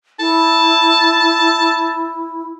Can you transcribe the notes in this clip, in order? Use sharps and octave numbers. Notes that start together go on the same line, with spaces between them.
E4 A5